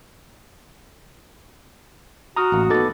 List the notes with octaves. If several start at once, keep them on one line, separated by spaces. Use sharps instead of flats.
F#4 A#5 D#6 F6
A1 A#3 D#5
B3 D#4 A4 D6 A6